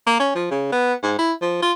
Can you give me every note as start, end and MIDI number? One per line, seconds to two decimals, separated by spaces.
0.07 0.20 58
0.20 0.33 61
0.35 0.46 53
0.51 0.68 49
0.72 0.94 59
1.03 1.17 44
1.19 1.32 64
1.42 1.60 53
1.62 1.73 65